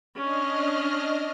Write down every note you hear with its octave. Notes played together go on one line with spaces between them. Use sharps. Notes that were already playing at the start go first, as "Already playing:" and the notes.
C#4 D4 D#5 F6